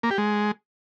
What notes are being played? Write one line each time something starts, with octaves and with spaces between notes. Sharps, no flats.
A#3
G4
G#3